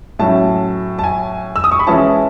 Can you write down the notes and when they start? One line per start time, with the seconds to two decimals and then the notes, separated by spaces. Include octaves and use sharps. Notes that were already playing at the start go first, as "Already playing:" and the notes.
0.19 A2 F#3 C#4 E4 A5
0.99 A5
1.04 G#5
1.56 E6
1.64 D#6
1.72 C#6
1.79 B5
1.87 E3 G#3 C#4 E4 A5